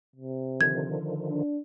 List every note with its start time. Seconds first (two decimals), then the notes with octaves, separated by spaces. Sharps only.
0.16 C3
0.61 D3 D#3 F3 G#6
1.30 D4